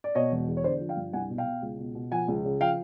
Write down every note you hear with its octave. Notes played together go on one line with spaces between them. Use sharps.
D5
B2 C#5 D#5
E1
E2
C#5
D3 C5 D5
F3
F5 G5
G2
C2 F#5 G#5
B2
F5 G5
B2
C#2
B2
B2
F3 F#5 G#5
C#2
C#3
F3 F5 G5